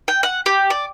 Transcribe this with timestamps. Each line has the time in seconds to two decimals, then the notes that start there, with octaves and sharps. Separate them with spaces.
0.08 G5
0.23 F#5
0.46 G4
0.70 D5